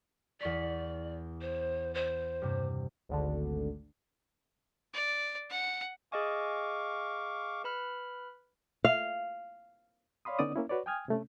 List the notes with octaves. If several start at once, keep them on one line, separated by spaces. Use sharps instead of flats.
E2 D5 C#6 B6
C5
C5
G2 C3
G#1 D2 D3
D5
F#5
G#4 D#5 F5 G#5 C#6 D6
B4 B5 F6
F5
C#5 D5 F5 B5 C6 D#6
D3 B3 C#4 D#4 D5 D#6
A#3 C#4 E4
F#4 B4 C#5 D5
G5 G#5 D#6 F6 G#6
C3 A3 C#4